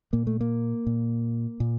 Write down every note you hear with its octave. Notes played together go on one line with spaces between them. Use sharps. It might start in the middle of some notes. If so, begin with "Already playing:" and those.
A#2 A#3
A3
A#3
A#2
A#2